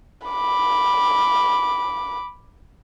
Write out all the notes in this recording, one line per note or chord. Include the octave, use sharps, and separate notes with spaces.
B5 D6